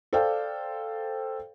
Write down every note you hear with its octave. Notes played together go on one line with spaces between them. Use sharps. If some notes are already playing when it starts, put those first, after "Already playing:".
A4 C5 D5 F5 G5